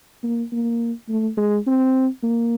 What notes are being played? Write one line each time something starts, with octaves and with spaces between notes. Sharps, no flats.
A#3
A#3
A3
G#3
C4
A#3